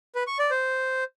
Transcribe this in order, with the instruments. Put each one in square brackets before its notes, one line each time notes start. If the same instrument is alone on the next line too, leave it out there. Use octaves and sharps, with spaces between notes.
[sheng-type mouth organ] B4
C#6
D5
C5